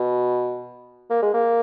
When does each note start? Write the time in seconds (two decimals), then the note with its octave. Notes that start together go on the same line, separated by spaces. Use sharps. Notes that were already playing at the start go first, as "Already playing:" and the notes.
Already playing: B2
1.10 A#3
1.22 G#3
1.34 A#3